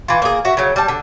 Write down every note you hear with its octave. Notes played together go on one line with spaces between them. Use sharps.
E3 F4
A#3 G#4
F#4 E5
C#3 F#3
G3 A5
D3